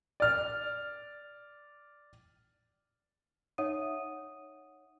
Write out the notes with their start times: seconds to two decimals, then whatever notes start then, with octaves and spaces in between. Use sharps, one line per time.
0.20 D5 F6
3.58 D#4 C#5 E5 F#5 D#6 D#7